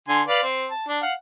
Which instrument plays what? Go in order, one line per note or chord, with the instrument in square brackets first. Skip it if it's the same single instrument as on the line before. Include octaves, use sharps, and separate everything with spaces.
[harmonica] D3 G#5 C6
B4 D5 F5
C4
A5
D4
F5 F#5